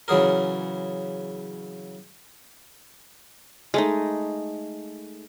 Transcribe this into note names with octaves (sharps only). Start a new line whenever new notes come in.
C#3 E3 F#3 G#4 A#4
G#3 A3 D#4